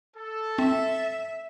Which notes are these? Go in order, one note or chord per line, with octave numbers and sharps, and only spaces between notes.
A4
C4 E5